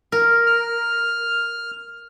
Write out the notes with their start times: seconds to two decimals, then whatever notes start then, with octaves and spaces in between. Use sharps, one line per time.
0.12 A#4
0.46 F6